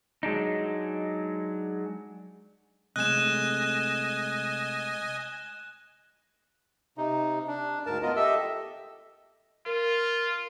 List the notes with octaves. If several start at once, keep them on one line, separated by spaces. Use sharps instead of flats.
F#3 G#3 D4 D#4
C3 G#3 A3 D#5 G#5 F#6 E7
C3 D#4
D4
D2 G#2 A#4 A5
B3 F4 A#4 D#5
G4 A4 D#5 E5 E6
F4 A#4